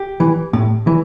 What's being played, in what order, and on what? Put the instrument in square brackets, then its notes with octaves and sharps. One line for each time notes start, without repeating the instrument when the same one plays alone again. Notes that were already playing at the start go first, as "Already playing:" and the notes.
Already playing: [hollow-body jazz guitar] G4
E3
A2
E3